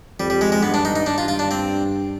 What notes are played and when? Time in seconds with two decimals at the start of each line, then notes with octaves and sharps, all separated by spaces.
0.19 F2 G3
0.30 G3
0.41 G#3
0.52 G#3
0.63 G2 B3
0.74 D4
0.85 D#4
0.96 D#4
1.06 G2 D4
1.18 F4
1.28 F4
1.39 D4
1.51 C4